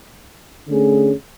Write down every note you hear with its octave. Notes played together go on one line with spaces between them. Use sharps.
D3 A3 C#4 G#4